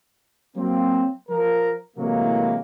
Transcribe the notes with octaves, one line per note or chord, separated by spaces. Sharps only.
F#3 A#3 C4
F3 A#4
A2 C3 E3 F#3 G#3 A#3